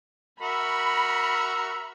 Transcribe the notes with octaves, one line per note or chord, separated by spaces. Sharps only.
F#4 A#4 E5 B5